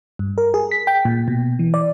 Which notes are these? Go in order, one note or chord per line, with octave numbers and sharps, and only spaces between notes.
G2
A#4
G#4
B6
G5
A#2
B2
E3
D5